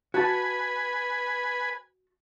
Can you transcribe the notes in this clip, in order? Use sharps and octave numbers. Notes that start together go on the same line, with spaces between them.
F#4 B4 G#5 A5